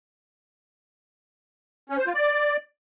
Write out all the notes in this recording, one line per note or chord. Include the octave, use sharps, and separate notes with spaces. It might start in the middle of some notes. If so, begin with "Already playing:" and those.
C#4
C5
F4
D5